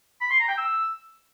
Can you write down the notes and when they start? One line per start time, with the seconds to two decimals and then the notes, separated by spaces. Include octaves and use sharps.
0.21 B5
0.30 C6
0.39 A#5
0.49 G5
0.58 E6